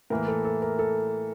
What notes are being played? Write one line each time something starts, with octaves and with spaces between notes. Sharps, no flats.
A2 E3 A#3 A#4
A4
A4
A#4
A4